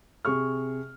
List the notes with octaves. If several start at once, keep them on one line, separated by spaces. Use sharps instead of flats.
C3 G#4 C#6 F6